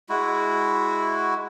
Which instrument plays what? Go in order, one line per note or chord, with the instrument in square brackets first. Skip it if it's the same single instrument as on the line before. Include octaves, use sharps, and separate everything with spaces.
[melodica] G#3 E4 F#4